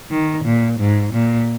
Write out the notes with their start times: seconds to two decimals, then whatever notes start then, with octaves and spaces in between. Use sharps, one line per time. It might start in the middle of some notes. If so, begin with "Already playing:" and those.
0.11 D#3
0.45 A#2
0.80 G#2
1.13 A#2